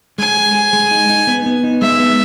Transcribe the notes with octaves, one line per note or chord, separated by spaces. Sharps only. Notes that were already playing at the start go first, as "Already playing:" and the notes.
G#3 G#5
G#4
G#4
G#3
D#4
D#4
B3
B3
D#4
G#3 E5
B3